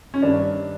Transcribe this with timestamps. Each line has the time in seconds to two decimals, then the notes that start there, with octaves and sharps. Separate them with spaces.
0.14 C#4
0.22 G2 D#3 D4